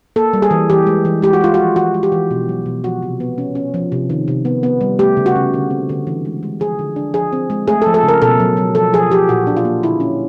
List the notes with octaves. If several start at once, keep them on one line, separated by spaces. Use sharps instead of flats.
A#3 A4
G3
G#4
E3
E3 G4
G#3
E3
G#3 G4
F#4
G#3 F4
F#4
F3
E3 F#4
G#3
G4
E3
B2
F#3
B2
F3 F#4
C3
B3
C#4
C#4
F3
C3
D#3
C3
B3
B3
G3
A3 G4
C#3
F#4
C#3
D3
C4
D3
E3
G#3
G#3
F3 G#4
D3
D4
F3 G#4
C4
G#3
A3 G#4
A4
F3
A4
C#3
A#4
B2 A4
F#3
F#3
F3 A4
F3 G#4
F3 G4
A#2 F#4
D4
F4
A#3
D3 E4
C#4